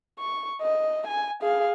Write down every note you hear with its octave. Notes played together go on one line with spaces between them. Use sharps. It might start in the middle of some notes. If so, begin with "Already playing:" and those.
C#6
D#5
G#5
G#4 F5